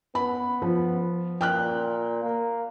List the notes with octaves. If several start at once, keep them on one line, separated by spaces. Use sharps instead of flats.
B3 B5
F3
A#2 G5 F6 F#6
A#3